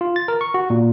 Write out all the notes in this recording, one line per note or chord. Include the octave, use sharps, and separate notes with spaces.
F4
A6
A#4
C#6
F#4
A#2